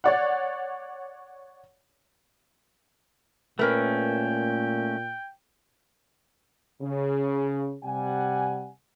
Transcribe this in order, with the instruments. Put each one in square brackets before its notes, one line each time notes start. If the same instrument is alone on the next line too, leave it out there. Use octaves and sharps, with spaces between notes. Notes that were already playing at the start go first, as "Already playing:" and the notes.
[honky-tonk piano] C#5 D5 F#5
[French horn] A#2 [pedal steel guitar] A3 C#4 [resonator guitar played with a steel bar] A#4 B4 [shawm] G5
[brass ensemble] C#3
C3 G3 F#5 G#5